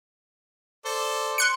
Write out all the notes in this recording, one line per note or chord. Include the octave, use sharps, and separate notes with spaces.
A4 C5 D5
C6 F#6 C#7